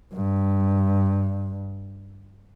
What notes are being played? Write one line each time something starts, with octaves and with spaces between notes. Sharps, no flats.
G2